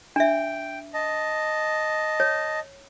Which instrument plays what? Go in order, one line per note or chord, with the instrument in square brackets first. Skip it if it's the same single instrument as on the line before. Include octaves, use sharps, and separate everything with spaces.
[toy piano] D4 E5 [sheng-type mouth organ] G5
[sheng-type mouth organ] D#5 A5
[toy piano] C#5